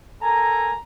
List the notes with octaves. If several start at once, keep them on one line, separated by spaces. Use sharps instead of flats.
A4 A#4 G#5 A#5